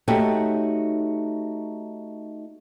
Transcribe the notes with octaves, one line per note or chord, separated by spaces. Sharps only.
A3 D#4 F#4 G4 C#5 A5